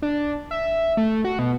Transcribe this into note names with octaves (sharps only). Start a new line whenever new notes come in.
D4
E5
A3
F#4
B2